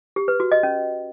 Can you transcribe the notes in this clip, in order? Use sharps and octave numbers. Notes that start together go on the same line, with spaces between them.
G4
B4
F#4
D#5
C#4